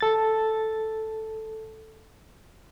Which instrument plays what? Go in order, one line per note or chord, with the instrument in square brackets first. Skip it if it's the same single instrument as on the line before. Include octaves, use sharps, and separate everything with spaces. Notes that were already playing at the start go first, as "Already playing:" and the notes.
[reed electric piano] A4 A6